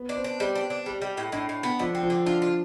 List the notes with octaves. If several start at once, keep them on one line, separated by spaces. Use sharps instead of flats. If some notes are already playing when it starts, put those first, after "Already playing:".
Already playing: B3
D4
C4
D4
G3 C4
D4
D4
G3
G3
A2
A2 D4
A2
B3
D3 F3
C4
F3
D3
D4 F4
F4